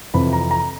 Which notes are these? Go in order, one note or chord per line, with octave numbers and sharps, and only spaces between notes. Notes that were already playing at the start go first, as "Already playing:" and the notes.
F2 C3 E3 B5
A#5
A#5